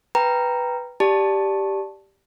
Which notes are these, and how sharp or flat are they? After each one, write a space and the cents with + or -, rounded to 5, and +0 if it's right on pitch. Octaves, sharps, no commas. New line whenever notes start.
B4 +0 G5 +0 A#5 +0
G4 +0 D5 +0 A5 -5